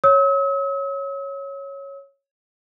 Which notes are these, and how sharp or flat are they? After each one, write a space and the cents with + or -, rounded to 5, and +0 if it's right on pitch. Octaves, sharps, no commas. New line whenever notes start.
C#5 -5 E6 -45